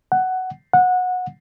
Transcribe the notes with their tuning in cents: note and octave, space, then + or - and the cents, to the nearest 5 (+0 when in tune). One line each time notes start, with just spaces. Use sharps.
F#5 +10
F#5 -20